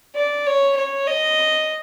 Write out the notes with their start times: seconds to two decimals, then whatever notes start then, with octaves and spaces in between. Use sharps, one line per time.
0.16 D5
0.47 C#5
0.77 C#5
1.07 D#5